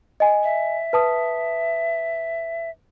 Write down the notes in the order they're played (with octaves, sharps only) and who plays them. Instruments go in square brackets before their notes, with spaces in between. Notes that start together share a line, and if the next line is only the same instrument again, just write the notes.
[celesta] D#5 G#5
[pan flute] E5
[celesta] B4 A5 D#6